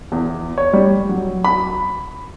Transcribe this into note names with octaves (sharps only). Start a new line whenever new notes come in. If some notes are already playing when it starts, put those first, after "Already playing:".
E2
C#5
G3
F#3
B5